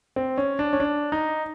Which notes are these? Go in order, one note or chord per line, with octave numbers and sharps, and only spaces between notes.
C4
C#4
D4
C#4
D4
D#4